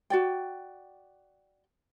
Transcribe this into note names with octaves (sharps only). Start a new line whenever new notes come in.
F#4 D5 G5